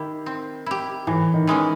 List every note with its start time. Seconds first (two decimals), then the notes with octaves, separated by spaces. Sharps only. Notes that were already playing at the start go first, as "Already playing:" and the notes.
Already playing: D#3 E4 G4
0.26 C4
0.66 E4 G4
1.07 A2 E3
1.34 D#3
1.47 E3 G#3 C#4